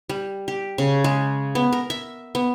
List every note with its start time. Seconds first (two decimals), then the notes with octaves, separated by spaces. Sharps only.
0.09 G3
0.48 G4
0.78 C#3
1.04 G#3
1.55 B3
1.73 A#4
1.90 E5
2.35 B3